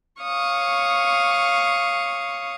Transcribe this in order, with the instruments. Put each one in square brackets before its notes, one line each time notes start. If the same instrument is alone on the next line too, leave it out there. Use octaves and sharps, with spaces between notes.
[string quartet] C#5 F5 C#6 D#6